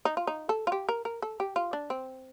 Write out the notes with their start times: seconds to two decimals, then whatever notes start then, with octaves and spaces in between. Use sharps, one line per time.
0.05 D#4
0.17 F4
0.27 D#4
0.49 A4
0.67 F4
0.72 G4
0.89 A#4
1.05 A#4
1.22 A4
1.40 G4
1.56 F4
1.73 D4
1.90 C4